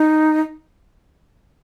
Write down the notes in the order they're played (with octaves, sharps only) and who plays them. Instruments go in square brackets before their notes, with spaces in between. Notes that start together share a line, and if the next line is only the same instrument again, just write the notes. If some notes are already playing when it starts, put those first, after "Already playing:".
Already playing: [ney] D#4